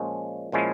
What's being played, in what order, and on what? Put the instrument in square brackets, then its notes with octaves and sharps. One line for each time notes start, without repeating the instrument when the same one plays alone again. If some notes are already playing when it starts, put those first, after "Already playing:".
Already playing: [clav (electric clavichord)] A#2 F3 G#3 C#4
A#2 F3 G#3 C#4 E4